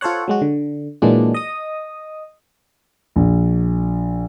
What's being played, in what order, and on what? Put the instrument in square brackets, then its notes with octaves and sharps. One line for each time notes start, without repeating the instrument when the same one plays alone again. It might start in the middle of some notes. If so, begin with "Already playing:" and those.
[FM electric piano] F4 A4 C5 C#5 F#5
F#3 G#3 F#4
D3
A#2 E3 F#3 G#3 D4
D#5 D#6
[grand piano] A#1